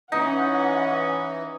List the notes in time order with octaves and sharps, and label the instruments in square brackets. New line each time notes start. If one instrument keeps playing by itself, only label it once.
[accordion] E3 [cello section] C#4 [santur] D#4 [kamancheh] F#5